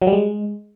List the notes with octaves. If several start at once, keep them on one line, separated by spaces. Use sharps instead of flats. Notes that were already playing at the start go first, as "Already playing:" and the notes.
F#3
G3
G#3